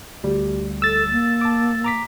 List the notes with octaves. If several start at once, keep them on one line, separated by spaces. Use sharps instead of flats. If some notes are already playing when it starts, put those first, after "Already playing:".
D2 G3 G4
A4 E6 A6
A#3
A5 D6
A#5 D6 B6